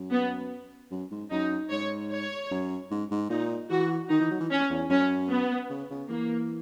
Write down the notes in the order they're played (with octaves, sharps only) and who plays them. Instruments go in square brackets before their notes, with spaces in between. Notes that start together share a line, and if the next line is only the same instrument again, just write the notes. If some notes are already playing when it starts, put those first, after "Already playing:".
Already playing: [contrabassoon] F#2
[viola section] B3
[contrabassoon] F#2
G#2
[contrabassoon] F#2 [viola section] D#4
[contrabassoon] G#2 [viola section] C#5
[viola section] C#5
[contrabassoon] F#2
G#2
G#2
[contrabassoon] A#2 [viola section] D#4
[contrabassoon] E3 [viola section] F#4
[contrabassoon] D#3 [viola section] D#4
[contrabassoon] E3
F#3
E3
[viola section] C#4
[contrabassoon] E2
[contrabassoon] F#2 [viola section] C#4
[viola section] B3
[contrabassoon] C#3
C#3
[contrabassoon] E3 [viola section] A#3